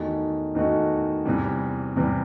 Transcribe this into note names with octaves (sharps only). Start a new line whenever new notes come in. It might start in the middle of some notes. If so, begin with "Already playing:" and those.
Already playing: E2 D#3 A3 D#4 F#4
E2 D#3 A3 D#4 F#4
E2 C3 E3 G3
E2 C3 E3 G3